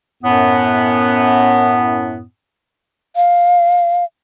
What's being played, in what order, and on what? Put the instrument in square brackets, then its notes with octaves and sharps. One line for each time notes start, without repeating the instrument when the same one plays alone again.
[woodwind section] F#2 A2 B3
[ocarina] F5